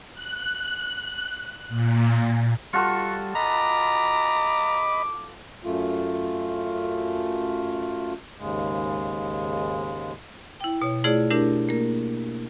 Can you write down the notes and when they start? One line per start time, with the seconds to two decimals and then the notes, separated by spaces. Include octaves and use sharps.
0.13 F#6
1.68 A#2
2.73 G3 F4 F#4 A4 C#6
3.35 D#5 A#5 B5 D6
5.64 F#2 A3 F4
8.37 D#2 G#2 C#3 G#3
10.60 E4 G5
10.82 B2 C#5
11.04 A3 E4 F4 G#4 C#5 D5
11.30 A3 D4 E4 G4 A#4
11.69 A#3 A#4